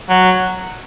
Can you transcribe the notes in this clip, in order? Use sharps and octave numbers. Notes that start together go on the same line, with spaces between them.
F#3